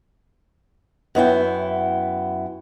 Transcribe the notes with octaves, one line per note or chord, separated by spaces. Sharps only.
F#2 B3 E4 G5